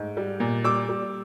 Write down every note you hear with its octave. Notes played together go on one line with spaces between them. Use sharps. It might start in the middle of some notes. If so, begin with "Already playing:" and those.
Already playing: G#2 A3
G3
A#2
G3 D6 E6
G3